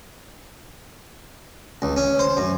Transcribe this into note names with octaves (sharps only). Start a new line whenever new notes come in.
C#2
C#4
C5
F#2